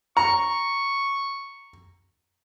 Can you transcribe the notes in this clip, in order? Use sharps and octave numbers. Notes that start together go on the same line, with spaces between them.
A#5 C#6